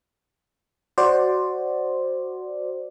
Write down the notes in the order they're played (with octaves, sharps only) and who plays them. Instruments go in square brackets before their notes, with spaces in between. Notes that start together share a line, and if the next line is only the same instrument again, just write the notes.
[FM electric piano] F#4 C5 D5